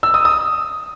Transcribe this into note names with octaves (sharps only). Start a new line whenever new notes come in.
E6
D#6
D#6